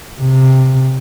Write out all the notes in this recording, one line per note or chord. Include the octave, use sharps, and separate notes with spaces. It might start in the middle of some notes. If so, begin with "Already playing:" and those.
C3